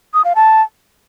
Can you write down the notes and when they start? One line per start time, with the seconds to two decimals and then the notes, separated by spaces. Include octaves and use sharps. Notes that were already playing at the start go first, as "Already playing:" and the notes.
0.14 D#6
0.25 F5
0.36 A5